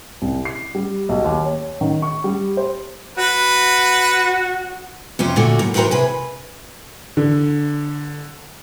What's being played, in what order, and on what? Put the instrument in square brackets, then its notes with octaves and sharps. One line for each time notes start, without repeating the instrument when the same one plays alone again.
[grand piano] C2
C7
G3
B1
D#2
C#5
D#3
C#6
G3
C5
[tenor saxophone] F#4 [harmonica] B4
[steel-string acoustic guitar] F2 C3 C#4 F4
A#2 D3 A3 F#4
F#2 A2
E3 C4 F#4 G#4 A#4 C5
C3 G#4 B4
[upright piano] D3